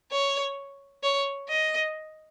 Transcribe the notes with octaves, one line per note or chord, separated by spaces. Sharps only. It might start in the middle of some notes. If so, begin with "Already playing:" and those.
C#5
C#5
D#5